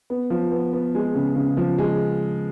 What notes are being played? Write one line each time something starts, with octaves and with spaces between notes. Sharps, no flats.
B3
F3
B3
B3
G#3
C#3
C#3
F3
G#3